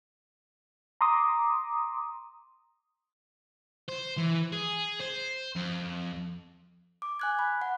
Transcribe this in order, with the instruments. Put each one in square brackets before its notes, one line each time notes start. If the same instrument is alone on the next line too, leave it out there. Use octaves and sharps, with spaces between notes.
[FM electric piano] A#5 C6 D6 D#6
[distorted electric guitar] C5
E3
G#4
C5
F2
[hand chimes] D6
G#5 F#6 G#6
B5
F#5